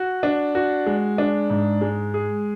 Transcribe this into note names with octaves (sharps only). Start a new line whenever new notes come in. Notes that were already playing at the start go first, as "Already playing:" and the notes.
Already playing: F#4
D4
F#4
G#3
D4
G#2
G#3
G#4